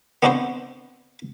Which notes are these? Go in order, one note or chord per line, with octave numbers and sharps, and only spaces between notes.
B3 C4 D4 E4 F#4 C5